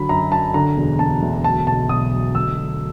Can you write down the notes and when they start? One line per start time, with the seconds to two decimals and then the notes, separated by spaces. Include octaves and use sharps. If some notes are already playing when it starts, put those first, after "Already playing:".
Already playing: D3 F#3 B5
0.09 F#2 A#5
0.32 F#2 A5
0.54 D3 A#5
0.77 E1
0.99 E1 A5
1.22 D2
1.44 F#3 A5
1.67 B1 A5
1.89 B1 D#6
2.13 F#3
2.35 D2 E6
2.58 F#3